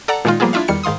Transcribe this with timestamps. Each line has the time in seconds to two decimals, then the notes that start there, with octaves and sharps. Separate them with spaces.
0.08 A4 D5 F#5 A5 A#5
0.25 A#2 D#3 G#3 D#4 F4
0.40 F3 G3 A#3 B3 F4 G#4
0.53 D4 E4 F4 E5 F5
0.68 E2 D#3 G3 F6 C#7
0.84 G#2 D#3 F5 C6 D#6